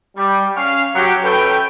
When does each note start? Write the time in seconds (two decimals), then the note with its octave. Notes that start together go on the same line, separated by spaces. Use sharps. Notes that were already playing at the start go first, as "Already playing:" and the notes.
0.17 G3
0.56 C#4 F5
0.96 F#3 G4
1.24 C#4 A4 B4 E5 G5